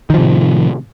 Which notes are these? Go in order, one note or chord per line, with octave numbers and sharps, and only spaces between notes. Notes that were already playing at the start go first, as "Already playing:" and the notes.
A2 C3 D#3 F3